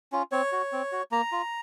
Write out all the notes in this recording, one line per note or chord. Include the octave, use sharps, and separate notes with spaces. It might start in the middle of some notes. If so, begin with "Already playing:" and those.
C#4 F4
C4 C#5
F#4
C4
F#4
A#3 A#5
F4